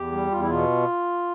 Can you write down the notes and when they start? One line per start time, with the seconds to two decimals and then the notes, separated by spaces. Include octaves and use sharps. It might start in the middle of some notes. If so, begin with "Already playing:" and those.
Already playing: E2 G4
0.12 G3
0.31 E2 F4
0.41 E4
0.49 B2 F4